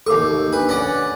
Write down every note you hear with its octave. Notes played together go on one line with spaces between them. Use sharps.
D#2 A4 A#4 C#6 D6
D4 B4
C#4 D5 F#5